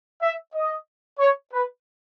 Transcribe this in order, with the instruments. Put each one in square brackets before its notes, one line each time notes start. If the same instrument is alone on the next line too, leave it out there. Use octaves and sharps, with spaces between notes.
[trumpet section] E5
D#5
C#5
B4